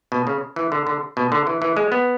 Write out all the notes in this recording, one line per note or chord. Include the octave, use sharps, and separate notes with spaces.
B2
C#3
E3
D3
D3
B2
D3
E3
E3
G#3
B3